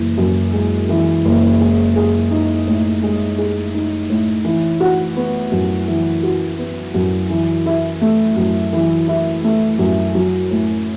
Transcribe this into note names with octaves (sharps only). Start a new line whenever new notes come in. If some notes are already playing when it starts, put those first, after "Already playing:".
Already playing: F#1 E3
F#2
G#3
E3
F#1
G#3
G#4
D#4
A2
G#3
G#4
D#4
A2
E3
F#4
B3
F#2
E3
F#4
B3
F#2
E3
E4
A3
F#2
E3
E4
A3
F#2
F#3
A2